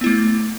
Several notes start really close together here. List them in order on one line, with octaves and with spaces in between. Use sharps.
B3 E4 A3